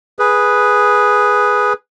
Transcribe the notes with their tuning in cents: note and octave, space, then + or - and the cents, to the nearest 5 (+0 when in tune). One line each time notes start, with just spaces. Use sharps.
G#4 +0 B4 +0